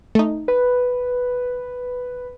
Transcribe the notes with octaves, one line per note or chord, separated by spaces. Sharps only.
A3 D#4
B4